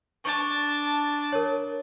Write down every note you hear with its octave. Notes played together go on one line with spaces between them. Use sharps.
D4 A5 C#6
A#4 C#5